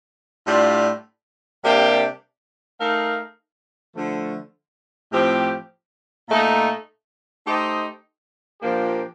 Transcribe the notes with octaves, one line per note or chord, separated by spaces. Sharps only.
A2 G3 D4 F4
C3 G3 A#3 D4 G4
A3 D#4 A#4 F5
D3 F3 A3
A2 F3 C4 G4
A#2 A3 D#4
A3 D#4 G4 C5 D#5
A#2 F3 A#3 D4 G4